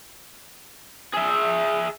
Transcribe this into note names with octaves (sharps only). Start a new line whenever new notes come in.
G#4 E5